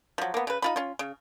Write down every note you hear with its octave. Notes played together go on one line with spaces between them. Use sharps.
F3 F#3
A#3 B3
C#3 B4
D#4 F4 B5
C#4 F4
C#3